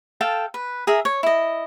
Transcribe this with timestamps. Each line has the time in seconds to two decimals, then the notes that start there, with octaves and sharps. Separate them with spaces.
0.21 A4 F5 G5 A5
0.54 B4
0.87 G#4 A#4 E5
1.05 C#5
1.23 E4 D#5